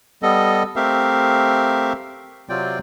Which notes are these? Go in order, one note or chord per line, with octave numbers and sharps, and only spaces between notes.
G3 B3 A4 D#5
A3 C4 G4 A#4 E5 F5
C3 F#3 C4 F4 D5 G5